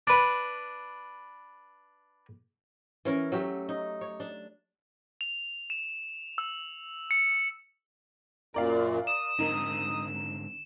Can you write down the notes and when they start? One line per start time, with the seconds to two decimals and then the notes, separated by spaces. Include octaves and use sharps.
0.07 D4 B4 B5
3.05 E3 C#4 A#4
3.32 F#3 A3 G4
3.69 D#4
4.01 C#5
4.20 D4
5.21 F7
5.70 E7
6.38 E6
7.11 C#7
8.54 F#2 A#2 A#4 D5 F5
9.07 D#6 E7
9.39 G#2 D3 C4 D#4 A#4